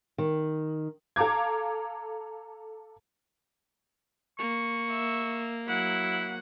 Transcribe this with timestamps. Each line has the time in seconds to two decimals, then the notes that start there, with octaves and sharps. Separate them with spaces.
0.18 D#3
1.16 A4 F5 A#5 D6 G#6
4.39 A#3 C#6
4.91 E5
5.68 F#3 E4 F#5